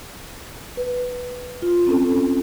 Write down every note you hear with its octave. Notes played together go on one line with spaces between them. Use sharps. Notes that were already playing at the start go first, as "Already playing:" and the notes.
B4
F4
C4 C#4 A4